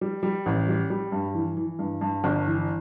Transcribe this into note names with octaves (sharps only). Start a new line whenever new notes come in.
G3
G3
A1
G3
G3
G2
E3
E3
G2
G2
G1
E3